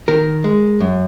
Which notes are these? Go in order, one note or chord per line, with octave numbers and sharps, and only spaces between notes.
D#3 A#4
G#3
F#2